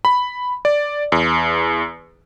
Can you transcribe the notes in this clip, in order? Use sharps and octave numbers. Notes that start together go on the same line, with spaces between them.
B5
D5
E2